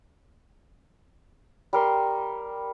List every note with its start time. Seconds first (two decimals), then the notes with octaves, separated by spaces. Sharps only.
1.73 G3 A#4 C6